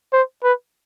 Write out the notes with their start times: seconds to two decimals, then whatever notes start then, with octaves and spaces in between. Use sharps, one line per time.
0.13 C5
0.43 B4